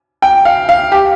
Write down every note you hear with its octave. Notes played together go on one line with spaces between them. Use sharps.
G5
F5
F5
G4